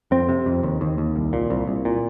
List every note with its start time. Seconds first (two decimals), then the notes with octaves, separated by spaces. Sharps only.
0.11 F2 C4
0.29 C3
0.46 F2
0.63 D#2
0.81 D#2
0.98 D#2
1.16 C2
1.33 A#2
1.50 C2
1.67 C2
1.85 A#2